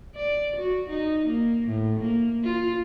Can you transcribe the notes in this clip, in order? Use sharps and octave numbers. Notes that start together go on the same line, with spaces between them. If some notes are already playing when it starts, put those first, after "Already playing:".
D5
F#4
D#4
A#3
A2
A#3
F4